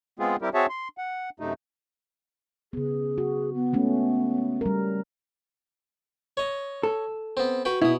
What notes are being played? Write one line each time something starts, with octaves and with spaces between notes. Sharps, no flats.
G#3 B3 C4 F4 G#4
G3 C4 E4 G4 A#4
C4 F#4 G#4 C#5 E5 A5
C6
F#5
F#2 C3 A3 D#4
C#3 B3 G#4
F#4
B3
G#3 A3 C#4
G3 A#4
C#5 D#5
A4
B3 C4
F#4 B4 G5
B2 E4 D#6